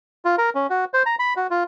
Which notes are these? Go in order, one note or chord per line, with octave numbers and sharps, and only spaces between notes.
F4
A#4
C#4
F#4
C5
A#5
B5
F#4
F4